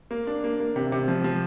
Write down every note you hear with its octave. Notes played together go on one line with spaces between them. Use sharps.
A#3
D4
A#3
A#3
C3
C3
F3
F3